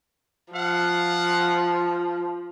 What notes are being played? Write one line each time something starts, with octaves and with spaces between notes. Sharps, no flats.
F3 F5 F#5